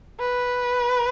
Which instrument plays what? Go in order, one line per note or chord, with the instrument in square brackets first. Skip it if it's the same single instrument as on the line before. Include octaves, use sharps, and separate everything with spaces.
[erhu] B4